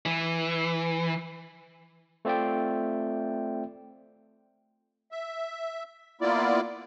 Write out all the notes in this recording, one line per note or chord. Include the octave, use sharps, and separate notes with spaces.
E3
A3 C4 F4 D5 E5 G5
E5
A#3 B3 E4 F4 D5